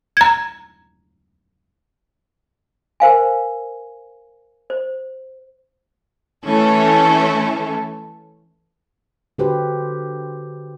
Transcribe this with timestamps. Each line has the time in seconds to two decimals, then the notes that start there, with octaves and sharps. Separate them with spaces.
0.17 A#5 G#6
3.00 A#4 C5 F5 G#5
4.70 C5
6.45 E3 A3 C#4 A4
9.38 D3 F#4 G4 B4 C5